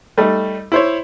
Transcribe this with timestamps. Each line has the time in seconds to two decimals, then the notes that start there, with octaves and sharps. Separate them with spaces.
0.17 G3 A3 D#4
0.72 E4 C5 C#5